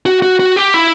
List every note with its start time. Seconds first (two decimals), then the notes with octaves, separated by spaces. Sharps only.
0.06 F#4
0.22 F#4
0.39 F#4
0.56 G4
0.74 E4